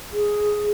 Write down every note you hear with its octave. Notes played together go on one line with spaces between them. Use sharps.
G#4